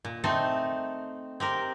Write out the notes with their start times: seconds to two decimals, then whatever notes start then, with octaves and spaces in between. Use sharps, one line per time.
0.05 A#2
0.24 A3 C4 D#4 A4
1.40 C4 G4 A#4